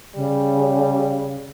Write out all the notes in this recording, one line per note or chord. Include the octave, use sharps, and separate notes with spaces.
C#3 G3